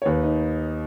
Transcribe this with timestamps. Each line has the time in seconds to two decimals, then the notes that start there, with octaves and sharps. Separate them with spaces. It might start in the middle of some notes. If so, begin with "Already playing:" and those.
0.02 C#5
0.05 D#2 B4
0.23 D#4